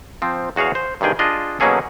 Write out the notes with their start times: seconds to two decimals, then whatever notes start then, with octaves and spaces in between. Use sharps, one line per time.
0.22 F3 C4
0.56 E2 F#4 G#4 C#5 F5
0.75 C5
1.01 G2 C3 D#3 G#4 G5
1.19 D4 F4 G#4 D#5
1.60 B2 F#3 A#3 C#4 G#4 A4